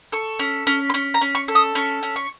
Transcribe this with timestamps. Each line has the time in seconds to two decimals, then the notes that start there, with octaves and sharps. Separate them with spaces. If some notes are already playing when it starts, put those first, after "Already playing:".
0.12 A4 C#6
0.39 C#4
0.67 C#4
0.89 C6
0.94 C#4 C#6
1.14 A#5
1.21 C#4
1.35 C#6
1.48 A4
1.55 D#6
1.75 C#4 C#6
2.03 C#4
2.16 C#6